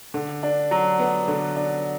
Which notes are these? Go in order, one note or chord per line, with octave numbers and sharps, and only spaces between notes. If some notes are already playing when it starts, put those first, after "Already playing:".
D3
D4
F#3
B3
D3
D4